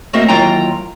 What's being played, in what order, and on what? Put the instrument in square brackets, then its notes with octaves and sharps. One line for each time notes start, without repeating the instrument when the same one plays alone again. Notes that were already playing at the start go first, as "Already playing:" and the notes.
[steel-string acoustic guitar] A3 A#3 C4 F#4 D#5 E5
D#2 E3 F#3 F4 G5 A#5